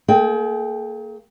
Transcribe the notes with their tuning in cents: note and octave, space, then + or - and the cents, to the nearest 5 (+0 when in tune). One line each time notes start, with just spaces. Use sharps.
A#3 -15 G#4 +40 G5 +0